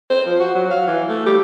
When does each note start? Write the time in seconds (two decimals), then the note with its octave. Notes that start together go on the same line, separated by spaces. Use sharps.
0.10 C5
0.26 F3
0.40 F#4
0.55 F#3
0.71 F5
0.87 E3
1.09 A3
1.26 G4